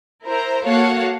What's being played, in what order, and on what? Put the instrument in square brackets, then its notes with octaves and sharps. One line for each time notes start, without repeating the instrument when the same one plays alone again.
[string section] E4 A#4 C5 A#5
A#3 F#4 A4 C#5 F5 F#5